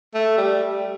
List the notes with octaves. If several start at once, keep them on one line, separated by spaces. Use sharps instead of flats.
A3
G3